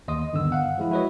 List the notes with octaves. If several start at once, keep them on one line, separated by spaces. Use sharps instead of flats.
D#2 D#5 C6 D#6
G2 D3 D#3 B3 E6
F5 F#5
F3 G#3 E4
E4 F#4 B4 C#5 D#5